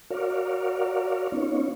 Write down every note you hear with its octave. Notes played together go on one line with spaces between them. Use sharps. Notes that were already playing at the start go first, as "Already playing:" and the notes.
F#4 A#4 C#5 D5 F5
B3 C#4 D#4 F4 C#5